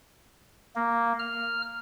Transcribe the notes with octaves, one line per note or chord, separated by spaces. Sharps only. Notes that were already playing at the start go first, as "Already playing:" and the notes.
A#3
F6